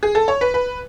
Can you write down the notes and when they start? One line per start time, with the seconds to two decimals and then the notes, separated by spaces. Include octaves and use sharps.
0.03 G#4
0.15 A4
0.28 C#5
0.41 B4
0.54 B4